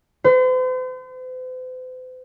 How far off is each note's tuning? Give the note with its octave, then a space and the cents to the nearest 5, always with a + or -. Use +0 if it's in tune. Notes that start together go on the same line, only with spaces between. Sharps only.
C5 -45